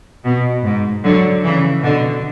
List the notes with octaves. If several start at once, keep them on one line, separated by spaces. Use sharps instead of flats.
B2
G#2
D3 F#3
C#3 E3
B2 D3